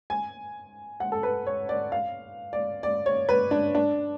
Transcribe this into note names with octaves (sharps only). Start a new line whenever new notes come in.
G#5
F#5
A4
B4
C#5
D5
F5
D5
D5
C#5
B4
D4
D4